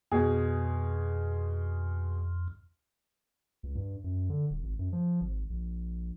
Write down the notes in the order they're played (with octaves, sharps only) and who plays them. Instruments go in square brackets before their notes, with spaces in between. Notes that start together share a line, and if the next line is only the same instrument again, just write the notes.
[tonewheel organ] F2 [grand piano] B2 G#4
[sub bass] C#2
G2
F#2
D3
D#1
G#1
F#2
F3
G#1
A#1